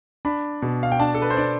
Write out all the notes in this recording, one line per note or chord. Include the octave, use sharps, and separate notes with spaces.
D4 B5
B2
F5
G5
D4 A5
A4
B4
C5
D4 D5